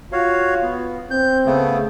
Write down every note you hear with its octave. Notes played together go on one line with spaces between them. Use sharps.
F4 F#4 C#5 F5
B3
C4 G6
C#3 A3 B3